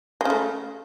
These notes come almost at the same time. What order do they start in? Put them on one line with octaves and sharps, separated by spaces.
G#3 C#3 A3